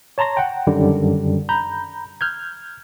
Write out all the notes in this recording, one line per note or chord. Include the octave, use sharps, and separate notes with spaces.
C#5 A5 A#5 C6 A#6
F#5 G5
F#2 D3 D#3 G3
A#5 B5 G6
F6 G6 G#6